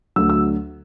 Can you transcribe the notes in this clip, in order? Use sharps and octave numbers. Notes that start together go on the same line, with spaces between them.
D2 D3 F#3 E6
E6